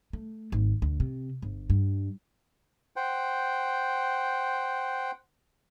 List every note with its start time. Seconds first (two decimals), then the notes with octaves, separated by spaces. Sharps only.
0.13 A3
0.52 G#1
0.82 D2
1.00 C3
1.42 G1
1.70 G2
2.96 C5 F#5 G5